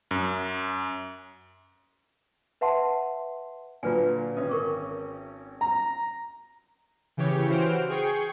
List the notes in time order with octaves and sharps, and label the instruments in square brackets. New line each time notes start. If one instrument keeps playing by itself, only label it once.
[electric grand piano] F#2
[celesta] B4 E5 F#5 A5 C6
[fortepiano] A#2 D3 F#3 [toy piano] F4 B4 G#5
[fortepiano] G#1 C#4 D#6
[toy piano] A#4 C#6 D6
[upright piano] A#5
[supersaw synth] C#3 E3 G4 C#5
E3 F#4 C5 F6 D7
G#4 G5 C#6 G#6 C7